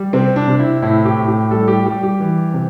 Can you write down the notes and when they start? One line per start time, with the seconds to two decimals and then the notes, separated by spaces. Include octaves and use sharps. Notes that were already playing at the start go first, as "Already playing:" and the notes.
Already playing: G3
0.13 C3 C4
0.36 D4
0.48 C3
0.60 E4
0.82 A2 E4
1.05 G4
1.17 A2
1.28 G4
1.51 G3 A4
1.68 G4
1.86 G3 G4
2.03 G4
2.20 E3
2.54 C3